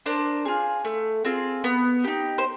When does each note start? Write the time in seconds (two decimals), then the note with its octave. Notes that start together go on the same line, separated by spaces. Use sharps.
0.06 D4 A#4 C5
0.45 F4 G#4
0.85 A3
1.25 C4 F4 G#4
1.64 B3
2.04 D#4 G4
2.38 C5